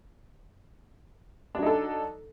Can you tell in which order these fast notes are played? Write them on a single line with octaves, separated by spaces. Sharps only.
D4 F#3 D#4 A4